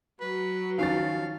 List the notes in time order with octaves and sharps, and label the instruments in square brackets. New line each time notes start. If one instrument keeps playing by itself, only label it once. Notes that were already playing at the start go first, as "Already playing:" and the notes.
[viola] F#3 [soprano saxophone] B4
[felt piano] D#3 [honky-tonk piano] F3 C#4 A6 [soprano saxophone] F5